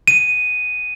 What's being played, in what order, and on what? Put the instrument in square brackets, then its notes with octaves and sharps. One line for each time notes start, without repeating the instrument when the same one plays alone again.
[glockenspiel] D#7